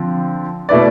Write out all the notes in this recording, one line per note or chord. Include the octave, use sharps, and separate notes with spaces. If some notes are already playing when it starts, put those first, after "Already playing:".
Already playing: D3 F3 C4
B2 A3 E4 B4 D5